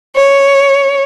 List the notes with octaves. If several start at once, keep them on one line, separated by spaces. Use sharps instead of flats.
C#5